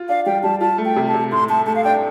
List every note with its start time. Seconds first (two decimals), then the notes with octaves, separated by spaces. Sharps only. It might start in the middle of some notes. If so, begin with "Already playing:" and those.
Already playing: F4
0.09 D4 F5
0.26 G3 G5
0.43 G3 A5
0.61 F4 A5
0.78 A3
0.85 G5
0.96 C3
1.08 A5
1.14 C3
1.31 A2 C6
1.49 A3 A5
1.66 A3 A5
1.76 F5
1.84 D4 G5